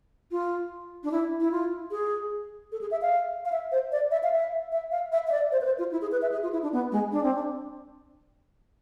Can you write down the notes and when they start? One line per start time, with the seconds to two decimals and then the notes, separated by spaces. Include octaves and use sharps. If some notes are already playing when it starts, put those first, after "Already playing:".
0.31 F4
1.04 D4
1.12 E4
1.40 E4
1.51 F4
1.91 G#4
2.72 A4
2.81 G#4
2.91 E5
3.02 F5
3.45 F5
3.52 E5
3.72 C5
3.92 D5
4.11 E5
4.23 F5
4.32 E5
4.72 E5
4.91 F5
5.12 E5
5.27 E5
5.32 D5
5.52 C5
5.61 B4
5.65 C5
5.78 F4
5.92 E4
6.01 G#4
6.12 B4
6.22 E5
6.32 G#4
6.43 F4
6.53 E4
6.63 D4
6.72 B3
6.92 G#3
7.12 D4
7.23 C4
7.34 D4